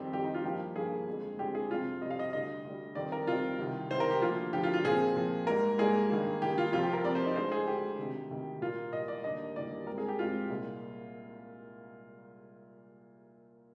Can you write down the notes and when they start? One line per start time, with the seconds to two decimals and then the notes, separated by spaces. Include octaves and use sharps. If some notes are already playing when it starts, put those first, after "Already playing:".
Already playing: F2 D#3 G3 C4 G4
0.13 F2 D#3 G3 C4 G4
0.24 D#4
0.34 F4
0.44 G2 F3 A#3 G4
0.76 G2 F3 A#3 G#4
1.07 F2 D3 G#3 C4
1.39 F2 D3 G#3 C4 G4
1.55 G#4
1.71 F2 C3 G3 C4 F4
2.01 F2 C3 G3 C4 D#5
2.11 F5
2.19 D#5
2.33 D2 D3 G3 D#5
2.64 D2 D3 G3
2.95 F2 D#3 G3 C4 D5
3.12 A#4
3.27 F2 D#3 G3 C4 F4
3.59 C2 C3 D#3
3.90 C2 C3 D#3 C5
4.00 A#4
4.11 G4
4.21 D2 D3 F3 A#3 F4
4.53 D2 D3 F3 A#3 G4
4.64 F4
4.74 F4
4.84 A#2 F3 C4 G#4
5.16 A#2 F3 C4
5.47 G#2 G3 A#3 A#4
5.78 G#2 G3 A#3 G#4
6.10 G2 D#3 A#3
6.41 G2 D#3 A#3 G4
6.58 F4
6.72 F2 C3 F3 C4 F4
6.83 G4
6.93 A#4
7.04 F2 C3 F3 C4 D5
7.15 C5
7.26 D#4
7.36 D2 D3 G#3 C5
7.52 G#4
7.67 D2 D3 G#3 G4
7.99 D2 C3 D#3
8.30 D2 C3 D#3
8.61 A#2 G3 A#3 F4
8.93 A#2 G3 A#3 D#5
9.08 D5
9.24 D#2 D3 G3 A#3 D#5
9.56 D#2 D3 G3 A#3 D5
9.87 G#2 G3 C4 A#4
9.98 G#4
10.08 G4
10.19 G#2 G3 C4 F4
10.49 C2 A#2 G#3